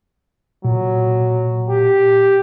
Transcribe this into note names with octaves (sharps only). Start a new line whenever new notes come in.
A#2 F#3
G4